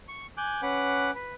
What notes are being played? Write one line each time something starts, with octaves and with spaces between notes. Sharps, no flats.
C#6
G#5 D6 F#6 G6
C#4 B4 F#5 D6 F#6
B4